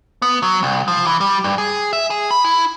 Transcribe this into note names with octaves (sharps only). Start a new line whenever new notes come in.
B3
F#3
C2
F3
E3
G3
G2
G#4
E5
G#4
B5
E4